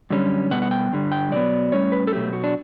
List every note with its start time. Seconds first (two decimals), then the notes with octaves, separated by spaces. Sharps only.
0.10 F#2 D3 G3 C#4
0.51 B2 G3 B3 F#5
0.62 F#5
0.71 G5
0.92 G2 D3 G3
1.12 G5
1.32 B2 F#3 B3 D5
1.72 A2 G3 C#4 C#5
1.92 B4
2.07 A4
2.12 B2 F#3 A3 G4
2.33 F#4
2.44 D4